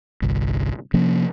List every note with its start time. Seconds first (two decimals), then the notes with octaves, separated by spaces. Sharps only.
0.22 G1 C2
0.94 C3 F3 A#3 C#4